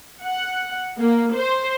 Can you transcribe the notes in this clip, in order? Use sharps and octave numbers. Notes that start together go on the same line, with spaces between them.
F#5
A#3
C5